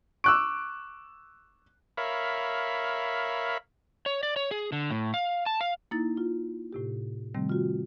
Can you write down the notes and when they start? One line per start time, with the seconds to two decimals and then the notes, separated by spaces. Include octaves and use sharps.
0.24 C#6 D6 E6 F#6 D7
1.97 A#4 C#5 E5 F5 B5
4.06 C#5
4.23 D5
4.36 C#5
4.51 G#4
4.72 D3
4.91 A2
5.14 F5
5.46 A5
5.61 F5
5.91 A#3 D#4 E4 A6
6.17 F4
6.73 A2 C3 G4
7.34 C3 D#3 G3 A3 C4
7.49 F4 F#4